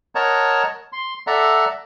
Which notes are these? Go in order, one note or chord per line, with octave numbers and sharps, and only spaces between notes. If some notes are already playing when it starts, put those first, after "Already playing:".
A#4 C#5 D#5 F#5 A5 A#5
C6
A4 D5 E5 F#5 A#5